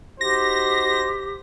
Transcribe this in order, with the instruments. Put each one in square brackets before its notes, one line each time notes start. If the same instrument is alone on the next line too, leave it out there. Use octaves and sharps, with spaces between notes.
[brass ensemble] D#4 F#4 C5 [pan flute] G4 [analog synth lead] A#6